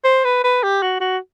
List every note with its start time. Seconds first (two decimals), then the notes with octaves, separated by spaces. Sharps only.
0.04 C5
0.25 B4
0.44 B4
0.63 G4
0.82 F#4
1.01 F#4